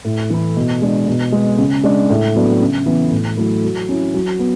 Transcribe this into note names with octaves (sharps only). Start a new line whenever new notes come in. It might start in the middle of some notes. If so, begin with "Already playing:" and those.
A2
E3 A3 E4
B2
G#3 D4
B2
G#3 B3
C#3
G#3 D4
A2
F#3 B3 D4
C#3
E3 B3
A2
F#3 A3 E4
F#3
C#4 E4
F#3
B3